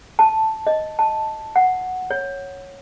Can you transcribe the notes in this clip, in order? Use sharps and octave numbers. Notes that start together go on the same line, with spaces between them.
A5
D#5
A5
F#5
C#5